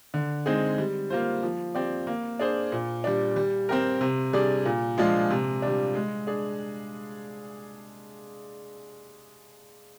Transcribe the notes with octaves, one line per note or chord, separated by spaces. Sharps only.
D3
G#3 C4 D#4 G#4
G3
A#3 F4 C5
F3
C4 G4 D5
A#3
D4 G#4 C5
A#2
G3 D4
G3
C4 G4 A#4
C3
G3 D4 G#4 D5
A#2
F3 G#3 D4 F4
C3
G3 D4
G#3
D4 G#4